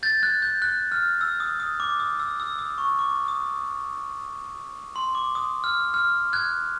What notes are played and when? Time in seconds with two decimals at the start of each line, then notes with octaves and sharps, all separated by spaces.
0.03 G6 A6
0.23 F#6 G#6
0.42 G6
0.62 F#6
0.92 F6
1.21 E6
1.40 D#6
1.60 D#6
1.80 D6
2.00 D#6
2.20 E6
2.40 E6
2.59 D#6
2.78 C#6
2.99 D6
3.28 D#6
4.96 C6
5.15 D6
5.35 D#6
5.64 F6
5.94 F6
6.33 F#6 G#6